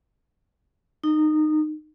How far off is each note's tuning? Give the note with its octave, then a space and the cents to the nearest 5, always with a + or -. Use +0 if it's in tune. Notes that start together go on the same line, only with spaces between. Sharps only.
D#4 -20